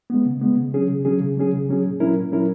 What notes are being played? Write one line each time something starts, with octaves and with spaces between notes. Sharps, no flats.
G#3 B3
C#3
G#3 B3
C#3
F#3 C#4 G#4
C#3
F#3 C#4 G#4
C#3
F#3 C#4 G#4
C#3
F#3 C#4 G#4
A#2
F#3 C#4 E4 A#4
A#2
F#3 C#4 E4 A#4